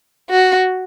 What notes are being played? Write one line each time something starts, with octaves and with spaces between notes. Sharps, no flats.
F#4